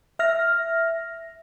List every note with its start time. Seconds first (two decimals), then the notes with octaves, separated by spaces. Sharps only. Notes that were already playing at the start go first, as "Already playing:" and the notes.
0.19 E5 F6 A#6